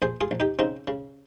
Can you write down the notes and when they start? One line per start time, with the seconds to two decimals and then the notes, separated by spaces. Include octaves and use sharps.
0.02 A#1 G#4 C5
0.21 F4 G#4
0.31 A#1
0.40 D#4 G4
0.59 C#3 C4 D#4
0.88 C#3